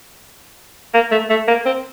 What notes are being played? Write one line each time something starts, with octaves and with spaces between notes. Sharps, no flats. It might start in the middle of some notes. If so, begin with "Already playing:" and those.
A#3
A3
A3
A#3
C4